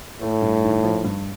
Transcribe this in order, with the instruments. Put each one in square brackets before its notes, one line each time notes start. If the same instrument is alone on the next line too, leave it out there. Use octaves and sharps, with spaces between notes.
[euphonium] A2 [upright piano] A3
[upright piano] G2
D#3
F3
G2